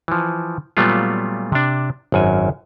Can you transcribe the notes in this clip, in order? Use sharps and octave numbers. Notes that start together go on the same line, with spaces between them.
E3 F3
A#2 F#3 G3 A3 B3 F4
C3 D4
G#1 F#2 G#5